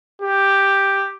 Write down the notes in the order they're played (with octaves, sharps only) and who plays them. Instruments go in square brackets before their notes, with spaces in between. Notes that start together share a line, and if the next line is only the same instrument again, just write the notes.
[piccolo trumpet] G4